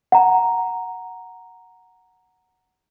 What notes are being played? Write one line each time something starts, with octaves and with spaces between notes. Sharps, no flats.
F#5 A#5